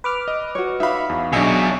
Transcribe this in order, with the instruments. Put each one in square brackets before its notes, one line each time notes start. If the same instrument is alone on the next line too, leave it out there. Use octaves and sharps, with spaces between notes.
[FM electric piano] B4 D6 F6
[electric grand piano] D#5
[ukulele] F#4 C#5
[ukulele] D#4 F#4 F5 [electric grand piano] E5 B5
[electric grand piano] E2
[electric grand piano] B1 D4 [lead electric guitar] B2 F#3 [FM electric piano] G#4 D#5 E5